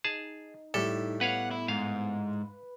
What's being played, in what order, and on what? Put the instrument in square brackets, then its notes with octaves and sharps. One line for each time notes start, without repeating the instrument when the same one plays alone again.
[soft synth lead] D#4 [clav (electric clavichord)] G#4 A5
[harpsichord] A2 G3 [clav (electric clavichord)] A4
[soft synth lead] B3 [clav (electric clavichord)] B4 C#5 F5 [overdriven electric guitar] F#5
[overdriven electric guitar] E4
[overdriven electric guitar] G#2 [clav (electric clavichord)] F5
[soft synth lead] B4